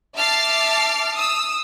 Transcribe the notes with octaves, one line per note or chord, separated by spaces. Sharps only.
E5 A5 D6 F6 A6 C7
D#6 E6